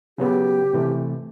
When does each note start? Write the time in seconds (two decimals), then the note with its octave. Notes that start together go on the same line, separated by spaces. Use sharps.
0.18 C#3 F#3 B3 G4
0.73 C3 E3 A3